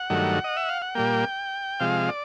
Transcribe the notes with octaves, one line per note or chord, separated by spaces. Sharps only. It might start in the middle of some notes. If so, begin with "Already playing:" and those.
Already playing: F#5
G2 D#3 F#3 A3
D#5
E5
F5
F#5
A#2 G3 A#3 G5
C3 F3 G#3 F5
D5